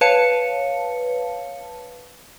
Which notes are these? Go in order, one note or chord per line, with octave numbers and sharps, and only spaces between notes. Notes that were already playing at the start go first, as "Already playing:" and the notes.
B4 C#5 F5 A5 C#7